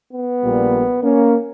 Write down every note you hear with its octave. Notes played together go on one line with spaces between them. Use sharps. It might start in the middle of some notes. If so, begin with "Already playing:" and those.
B3
A#1 A#2 G3
A#3 C#4